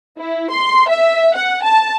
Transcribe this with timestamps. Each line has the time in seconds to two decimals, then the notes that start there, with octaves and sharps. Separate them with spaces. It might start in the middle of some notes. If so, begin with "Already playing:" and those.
0.18 E4
0.51 C6
0.88 E5
1.34 F#5
1.63 A5